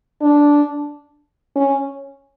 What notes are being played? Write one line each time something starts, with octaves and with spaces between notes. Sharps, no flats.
D4
C#4